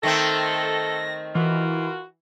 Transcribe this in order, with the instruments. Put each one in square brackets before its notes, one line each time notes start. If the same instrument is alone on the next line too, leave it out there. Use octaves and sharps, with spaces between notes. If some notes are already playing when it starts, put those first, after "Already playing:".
[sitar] D#3 A3 C4 [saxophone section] A4 [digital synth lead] A#6
[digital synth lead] E3 [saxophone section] F4 F#4 A#4